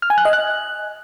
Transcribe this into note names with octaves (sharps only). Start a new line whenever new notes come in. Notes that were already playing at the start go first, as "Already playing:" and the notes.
F6
G#5
F#6
D#5
F#6